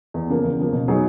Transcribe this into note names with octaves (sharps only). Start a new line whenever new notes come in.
E2
C#3 F3 A#3
E2
C#3 F3 A#3
B2
F#3 B3 D#4 G#4